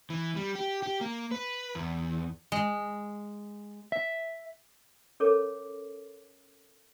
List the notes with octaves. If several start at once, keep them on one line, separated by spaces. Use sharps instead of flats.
E3
G3
G4
G4
A#3
B4
E2
G#3
E5
C#4 A4 A#4 C#5 D6